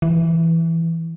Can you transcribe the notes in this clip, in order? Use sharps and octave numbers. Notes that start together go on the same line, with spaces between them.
E3